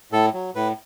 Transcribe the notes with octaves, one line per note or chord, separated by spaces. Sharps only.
A2 A4
F#3
A2 B4